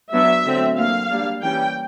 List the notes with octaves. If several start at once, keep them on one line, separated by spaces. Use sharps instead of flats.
F#3 B3 D4 E5
D3 F#3 A3 C4
D3 F#3 A#3 F5
G3 A#3 D4
E3 G3 A#3 C#4 G5